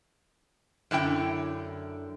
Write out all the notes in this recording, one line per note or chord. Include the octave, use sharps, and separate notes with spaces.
F#2 D3 E4 G5